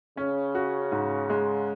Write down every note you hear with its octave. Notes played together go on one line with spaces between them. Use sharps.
C#3 C#4
F#4
G#2
G#3